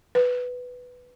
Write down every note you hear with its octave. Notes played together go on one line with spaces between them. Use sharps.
B4